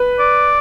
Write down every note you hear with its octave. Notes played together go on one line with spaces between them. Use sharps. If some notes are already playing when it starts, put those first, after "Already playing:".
Already playing: B4
D5